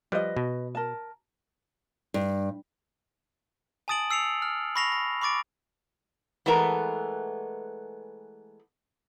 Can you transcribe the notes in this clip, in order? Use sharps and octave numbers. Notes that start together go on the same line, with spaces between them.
F3 G3 B4 D#5
B2
A#4 A5
G2
G#5 A5 D#6 A6 D7 F#7
E6 C7 C#7 F7
F6
B5 C#6 A#6 C7 F7
A#6
B5 C#6 D6 A6 D7
E3 G#3 A3 B3 A#4